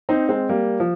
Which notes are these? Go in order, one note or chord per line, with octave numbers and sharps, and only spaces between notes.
C4 D#4
G#3 C4
G3 A#3
F3